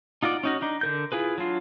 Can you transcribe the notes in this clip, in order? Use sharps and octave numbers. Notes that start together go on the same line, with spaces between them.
D#4 F4 F#4 D5
C#4 D#4 F#4
D4 D#4
D3 A#4 G6
E4 F4 G#4 B4
F#3 D4 F4